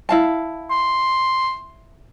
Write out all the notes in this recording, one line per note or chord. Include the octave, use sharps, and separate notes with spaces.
E4 F5 A5
C6